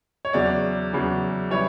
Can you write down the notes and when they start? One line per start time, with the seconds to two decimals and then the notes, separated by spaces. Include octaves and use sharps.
0.25 C#5
0.33 E2 C#3 F#3 D5
0.93 E2 C#3 F#3
1.51 E3 G3 C#5